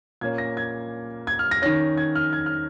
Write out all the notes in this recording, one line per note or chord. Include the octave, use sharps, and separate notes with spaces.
A#2 A#3 C#4 G#6
A#6
G#6
G#6
F6
A#6
D#3 C#4 A#6
G#6
F6
G#6
F6